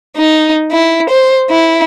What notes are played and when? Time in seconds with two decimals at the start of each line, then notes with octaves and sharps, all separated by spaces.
0.17 D#4
0.72 E4
1.10 C5
1.50 E4